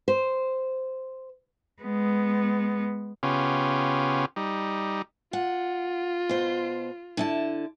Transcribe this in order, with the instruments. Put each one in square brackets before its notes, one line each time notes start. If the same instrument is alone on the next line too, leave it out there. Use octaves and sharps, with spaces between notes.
[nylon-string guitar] C5
[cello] G#3 B3
[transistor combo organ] C#3 B3 C#4 F4 G4
G3 D#4
[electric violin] F4 [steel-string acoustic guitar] F#5
[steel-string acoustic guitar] B2 C5
D3 E4 A5